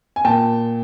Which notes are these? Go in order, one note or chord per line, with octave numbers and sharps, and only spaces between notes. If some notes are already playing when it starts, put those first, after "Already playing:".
G#5
A#2 G5 A5